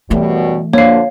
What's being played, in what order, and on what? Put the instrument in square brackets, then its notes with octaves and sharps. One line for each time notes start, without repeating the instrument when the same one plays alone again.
[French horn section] F#2 B2 G3 [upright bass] E3 A3
[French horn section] D3 F3 [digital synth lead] A#3 [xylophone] C#5 F5